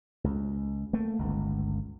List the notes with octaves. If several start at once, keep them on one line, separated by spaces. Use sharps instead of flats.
C#2
A3 A#3
G1 C#2